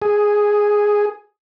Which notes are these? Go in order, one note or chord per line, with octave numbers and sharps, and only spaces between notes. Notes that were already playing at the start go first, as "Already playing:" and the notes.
G#4